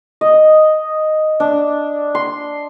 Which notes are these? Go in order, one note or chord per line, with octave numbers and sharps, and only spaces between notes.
D#5
D4
C6